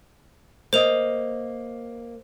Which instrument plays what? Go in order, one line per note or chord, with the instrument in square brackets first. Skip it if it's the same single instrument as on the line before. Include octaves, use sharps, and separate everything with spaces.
[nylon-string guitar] A#3 D#5 [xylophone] C5 F7